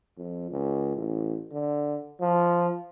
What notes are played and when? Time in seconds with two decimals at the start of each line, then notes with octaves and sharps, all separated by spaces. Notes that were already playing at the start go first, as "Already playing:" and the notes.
0.18 F2
0.51 C#2
0.96 A1
1.52 D3
2.21 F3